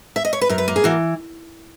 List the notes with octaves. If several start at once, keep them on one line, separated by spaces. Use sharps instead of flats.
E5
D#5
C#5
B4
F#2 A#4
B4
A#3
G#4
E3 F#4